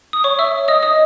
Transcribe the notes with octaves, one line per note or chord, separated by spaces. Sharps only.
D#6
C#5 C#6
E5 E6
D#5 D#6
D#5 D#6